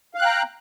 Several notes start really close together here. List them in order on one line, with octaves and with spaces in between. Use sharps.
F5 F#6 G5 A#5